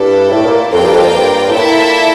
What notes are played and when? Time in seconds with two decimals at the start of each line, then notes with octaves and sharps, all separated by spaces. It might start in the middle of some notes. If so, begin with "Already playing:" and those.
Already playing: G2 E4 A4 D5
0.31 A2
0.44 A#2
0.71 F2 A#3 F4 A#4 D5 G5
0.81 G2
0.92 F2
1.02 F2
1.12 G2
1.46 A2
1.52 A#2 E4 A4 E5